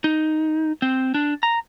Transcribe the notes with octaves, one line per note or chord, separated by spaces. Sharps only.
D#4
C4
D4
A#5